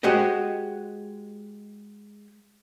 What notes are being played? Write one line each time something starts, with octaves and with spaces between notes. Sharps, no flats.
G#3 F#4 G4 C5 D#5